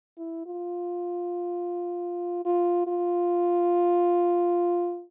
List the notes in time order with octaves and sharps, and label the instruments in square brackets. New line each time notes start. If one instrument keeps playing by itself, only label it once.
[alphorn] E4
F4
F4
F4